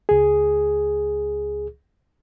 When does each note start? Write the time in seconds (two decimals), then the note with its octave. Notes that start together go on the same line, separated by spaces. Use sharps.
0.09 C#2 G#4